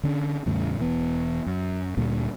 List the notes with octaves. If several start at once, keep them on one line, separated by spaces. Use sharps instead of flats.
D3 C#4 D4
E2 A2 C#3 G3
E1 E3 B3
F#2
D2 A#2 D3 G3